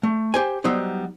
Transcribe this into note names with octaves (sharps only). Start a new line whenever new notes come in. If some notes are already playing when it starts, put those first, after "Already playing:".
A3
G4 C5 G#5
F#3 G3 B3 D#4 C5